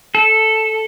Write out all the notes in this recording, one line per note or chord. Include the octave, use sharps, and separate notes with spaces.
A4